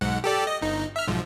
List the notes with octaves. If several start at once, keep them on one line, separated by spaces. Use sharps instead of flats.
B1 G#2 F#5
G4 A4 D5
D#5
G1 D#4
E5 F6
B1 G#2 F3